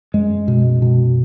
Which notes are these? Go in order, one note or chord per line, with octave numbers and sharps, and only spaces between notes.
F#2 G#3
B2
B2